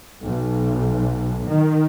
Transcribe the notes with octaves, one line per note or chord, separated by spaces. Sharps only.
B1
D#3